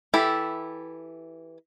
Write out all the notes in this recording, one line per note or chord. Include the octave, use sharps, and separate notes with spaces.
E3 E4 G4 A4